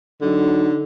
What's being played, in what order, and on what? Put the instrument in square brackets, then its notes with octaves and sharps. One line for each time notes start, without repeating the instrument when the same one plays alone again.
[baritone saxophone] D3 [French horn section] F#3 D#4